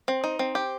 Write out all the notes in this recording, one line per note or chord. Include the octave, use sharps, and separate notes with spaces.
C4
D#4
C4
G4